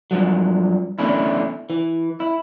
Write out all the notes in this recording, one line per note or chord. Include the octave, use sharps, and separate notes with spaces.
G2 F3 F#3
E2 D3 A3 C#4 E4
E3
E4